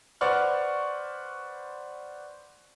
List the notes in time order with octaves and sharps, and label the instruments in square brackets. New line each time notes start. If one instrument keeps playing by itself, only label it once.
[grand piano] B4 C5 D5 F#5 C#6 F6